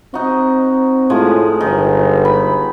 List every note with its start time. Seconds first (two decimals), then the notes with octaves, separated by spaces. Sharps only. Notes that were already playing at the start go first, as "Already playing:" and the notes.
0.14 C4 D#4 F#4
1.10 A2 F3 G#3 G#4
1.60 G1 D#3
2.25 B5